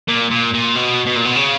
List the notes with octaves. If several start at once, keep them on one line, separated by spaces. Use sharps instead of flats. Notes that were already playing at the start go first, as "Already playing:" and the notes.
A#2
A#2
A#2
B2
B2
A#2
B2
C#3